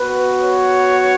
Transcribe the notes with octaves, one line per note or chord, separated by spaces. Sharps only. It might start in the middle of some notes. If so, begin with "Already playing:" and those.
Already playing: B3 F#4 B4
C#5